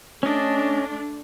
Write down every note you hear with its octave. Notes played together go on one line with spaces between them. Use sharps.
A3 C#4 D4 D#5